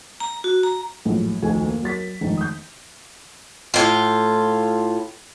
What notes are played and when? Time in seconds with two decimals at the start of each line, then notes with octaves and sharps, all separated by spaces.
0.20 A#5
0.44 F#4
0.63 A#5
1.05 A#1 F#2 A2
1.42 F1 D2 D#3 G#5
1.66 A#3
1.83 F#3 A#4 A6 B6
2.21 F1 G#2 D#3
2.37 D#6 G6
3.74 A2 F4